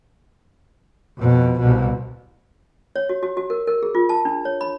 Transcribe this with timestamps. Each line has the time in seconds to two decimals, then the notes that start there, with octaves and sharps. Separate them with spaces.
1.18 F2 B2
1.60 C2 B2
2.96 C#5
3.09 F#4
3.23 F#4
3.37 F#4
3.50 A#4
3.67 A#4
3.83 G#4
3.95 F4
4.09 A5
4.25 D4
4.45 C#5
4.61 B5